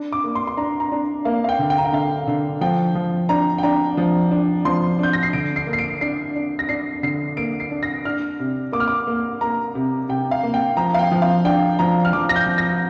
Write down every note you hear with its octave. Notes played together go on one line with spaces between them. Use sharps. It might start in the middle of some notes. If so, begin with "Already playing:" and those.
Already playing: D4
D6
A#3
C6
C6
D4 A#5
A#5
D4
A#3 F5
F5
G5
D3
G5
A#5
G5
D3 F5
D3
F3 G5
F3
D4 A#5
G5
D4 A#5
F3
D4
F3 C6
D4 G6
A#6
C7
D3 D7
C7
A#3
C7
D7
D4 C7
D4
A#6
D4 C7
D3 C7
A#3 D7
C7
D4
A#6
D4 F6
C3
A#3 D6
F6
D6
A#3
A#3 A#5
C3
C3 G5
F5
A#3
G5
F3 A#5
F5
G5
F3
F5
D4 G5
F3 A#5
F6
F3 D6
A#6
G6
F3
A#6